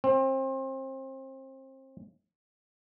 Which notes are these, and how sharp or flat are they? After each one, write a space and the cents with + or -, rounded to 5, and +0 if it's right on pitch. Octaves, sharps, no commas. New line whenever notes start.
C4 +30